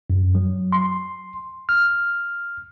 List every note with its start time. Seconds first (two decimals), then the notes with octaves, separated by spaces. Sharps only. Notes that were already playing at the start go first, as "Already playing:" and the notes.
0.10 F#2
0.35 F#3
0.72 C6
1.69 F6